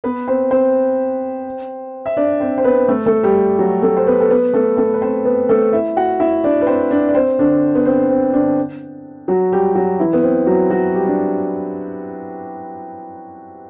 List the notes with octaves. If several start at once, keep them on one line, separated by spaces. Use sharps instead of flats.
B3 B4
C4 C5
C4 C5
E5
D4 D5
C4 C5
C5
B3 B4
A3 A4
A3 A4
G3 G4
F#3 F#4
A3 A4
C5
B3 B4
A4
B3 B4
A3 A4
A3 A4
B4
C4 C5
B3 B4
A3 A4
E4 E5
F#4 F#5
E4 E5
D4 D5
B4
C4 C5
D4 D5
D5
C4 C5
D3 D4
B3
C4
C4
D3 D4
F#3 F#4
G3 G4
F#3 F#4
E3 E4
B3
C4
F#3 F#4
F#3 F#4
G3 G4
D4